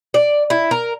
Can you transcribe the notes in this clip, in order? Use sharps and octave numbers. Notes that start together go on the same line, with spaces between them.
D5
E4
A#4